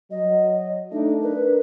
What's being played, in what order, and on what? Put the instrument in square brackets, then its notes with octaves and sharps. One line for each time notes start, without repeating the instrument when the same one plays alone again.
[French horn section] F#3 [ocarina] D#5
[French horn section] A3 D4 [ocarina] D#4
[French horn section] D4 A#4 [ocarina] B4